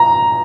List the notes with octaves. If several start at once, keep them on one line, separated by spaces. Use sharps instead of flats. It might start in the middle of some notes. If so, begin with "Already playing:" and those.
Already playing: A#5